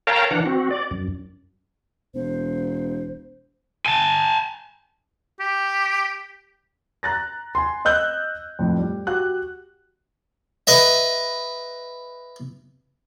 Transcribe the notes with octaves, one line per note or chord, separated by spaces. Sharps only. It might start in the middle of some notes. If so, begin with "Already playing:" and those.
A#4 C#5 F5 G5 A5 A#5
E3 D4 F#5
C4 F#4
D5
F#2
E1 C5
G#5 A5
G4
A#5 F#6 A6 A#6
G#5 C6
D#5 E6 F#6 G6
F2 A2
G3
F#4 G4 F#6
B4 D#5 E5